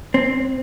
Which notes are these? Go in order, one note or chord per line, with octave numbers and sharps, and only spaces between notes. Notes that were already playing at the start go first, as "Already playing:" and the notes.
C4